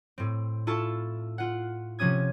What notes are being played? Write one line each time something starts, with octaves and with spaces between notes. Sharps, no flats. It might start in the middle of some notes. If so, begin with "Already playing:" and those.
A2 C4
E4 F4 A4 A5 C#6
F4 F#5
C3 F3 C#4 D#6 G#6